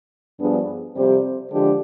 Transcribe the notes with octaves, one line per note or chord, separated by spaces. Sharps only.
G2 F3 B3 D4 G#4
F2 C3 G3 C4 G4
D3 F3 G#3 D4 G4